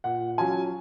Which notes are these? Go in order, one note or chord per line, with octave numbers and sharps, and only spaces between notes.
A#2 F#5
F#3 C#4 F4 G#5